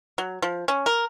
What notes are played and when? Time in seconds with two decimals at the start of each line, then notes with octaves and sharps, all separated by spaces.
0.18 F#3
0.42 F3
0.68 C#4
0.86 A#4